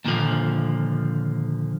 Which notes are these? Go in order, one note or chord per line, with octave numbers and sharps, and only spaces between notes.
D#2 A#2 D3 D#3 F3